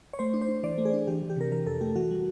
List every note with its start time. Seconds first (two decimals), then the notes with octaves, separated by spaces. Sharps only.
0.13 C#5
0.19 A3 C5
0.34 D4
0.41 C5
0.49 D4
0.63 E3 D5
0.78 A3
0.85 G#4
0.93 D4
1.07 E3 G4
1.22 E3
1.30 G4
1.36 C3 A#4
1.52 E3 A#4
1.66 F2 A4
1.81 A3 G4
1.95 E3 F#4
2.11 G3